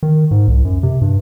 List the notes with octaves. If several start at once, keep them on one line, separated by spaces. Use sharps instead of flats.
D#3
G#2
C2
F#2
C3
G2